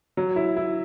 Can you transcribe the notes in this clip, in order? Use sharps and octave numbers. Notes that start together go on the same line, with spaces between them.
F#3
E4
E4